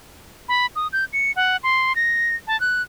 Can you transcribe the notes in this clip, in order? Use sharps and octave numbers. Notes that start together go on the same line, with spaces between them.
B5
D#6
G6
C#7
F#5
C6
A#6
A5
F#6